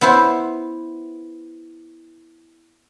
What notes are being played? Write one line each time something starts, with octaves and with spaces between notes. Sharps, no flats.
B3 E4 B4 C5